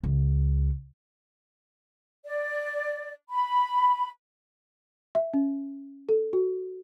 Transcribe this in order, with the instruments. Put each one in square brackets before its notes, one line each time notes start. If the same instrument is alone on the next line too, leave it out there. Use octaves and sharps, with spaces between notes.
[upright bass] C#2
[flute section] D5
B5
[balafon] E5
C#4
A4
F#4